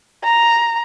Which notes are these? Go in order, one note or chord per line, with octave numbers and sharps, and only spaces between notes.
A#5